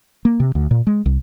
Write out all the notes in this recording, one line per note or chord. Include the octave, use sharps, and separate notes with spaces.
A#3
C3
D2
A#2
G#3
C2